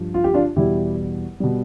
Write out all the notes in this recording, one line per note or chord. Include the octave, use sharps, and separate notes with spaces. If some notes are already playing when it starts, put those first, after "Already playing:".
Already playing: G2 F3
F4
G4
D4 F4
E2 B2 G3 E4 G4
B2 G3